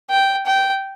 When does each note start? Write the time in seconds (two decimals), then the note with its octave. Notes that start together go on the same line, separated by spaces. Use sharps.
0.10 G5
0.46 G5